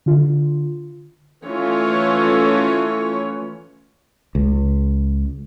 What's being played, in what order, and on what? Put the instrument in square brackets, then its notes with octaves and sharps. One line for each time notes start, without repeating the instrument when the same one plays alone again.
[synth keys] D3 F4
[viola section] E3 A3 C#4 F4 C#5
[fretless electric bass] C#2